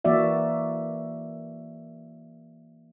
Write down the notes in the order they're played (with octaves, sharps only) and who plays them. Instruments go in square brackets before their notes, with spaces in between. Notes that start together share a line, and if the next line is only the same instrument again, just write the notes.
[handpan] E3 A#3 F#4 D5 E5